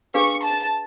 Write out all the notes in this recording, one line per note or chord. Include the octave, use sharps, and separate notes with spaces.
D4 G#4 B4 F5 C#6
A5